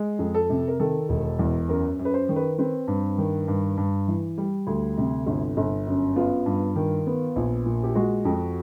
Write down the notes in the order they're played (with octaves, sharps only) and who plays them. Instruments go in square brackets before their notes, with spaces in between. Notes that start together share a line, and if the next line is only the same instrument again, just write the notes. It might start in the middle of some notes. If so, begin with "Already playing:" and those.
Already playing: [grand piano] G#3
F2
A4
C3
A#4
D#3 A4
E1
E2
F#2 A#4
F#2
B4
C5
D#3
B4
C4 B4
G2
D#3
G2
G2
E3
G3
D2
C3
G1
G1
F#2
B3 F4
G2
D#3
B3
A#1
A#2
G4
G#3 F#4
F2